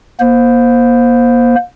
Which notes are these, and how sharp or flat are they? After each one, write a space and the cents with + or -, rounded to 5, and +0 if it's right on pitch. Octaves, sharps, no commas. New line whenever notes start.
A#3 +35 C5 +0